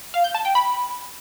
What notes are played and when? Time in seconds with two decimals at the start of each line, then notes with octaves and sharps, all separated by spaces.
0.14 F5
0.24 G6
0.35 A5
0.45 G5
0.55 B5